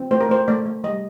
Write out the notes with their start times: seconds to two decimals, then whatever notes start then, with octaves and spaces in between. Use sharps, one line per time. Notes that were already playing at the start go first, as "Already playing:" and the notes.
Already playing: C4
0.11 A3 C5
0.21 A#4
0.29 A3 C5
0.48 A3 D5
0.66 A3
0.84 G3 D#5